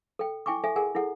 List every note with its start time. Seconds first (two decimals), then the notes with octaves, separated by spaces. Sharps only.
0.19 A4 G5
0.46 E4 G5 G#5 C#6 D6
0.64 A4 E5 G#5
0.76 G#4 A#4 F#5 G#5
0.95 E4 G#4 A4 F#5